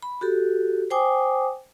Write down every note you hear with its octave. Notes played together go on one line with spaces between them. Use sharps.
B5
F#4 G4 A4
C5 G5 G#5 D6 D#6